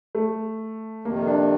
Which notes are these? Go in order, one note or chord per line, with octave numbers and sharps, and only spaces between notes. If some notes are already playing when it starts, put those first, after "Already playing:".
A3
F2 C3 D#3 A#3
D4